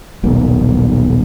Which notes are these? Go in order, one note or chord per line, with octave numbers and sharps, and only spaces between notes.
D#1 B1 A#3